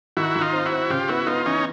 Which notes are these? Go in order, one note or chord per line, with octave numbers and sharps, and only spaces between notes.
D#3 E4 F#4
D#3
D#4 F4
C4
E4 F#4
C4
C#3 F4 G4
B3 E4 F#4
B3 D#4 F4
E3 C#4 D#4